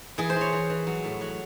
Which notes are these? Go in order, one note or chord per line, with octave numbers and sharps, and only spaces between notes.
E3 G#4
C5
E3
C#5
E3
E3
F#3
A2
F#3